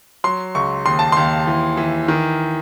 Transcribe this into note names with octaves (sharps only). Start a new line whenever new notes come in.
F#3 C6
C#2 C#6
D#2 C6
A5
D#2 C6
E3
E3
D#3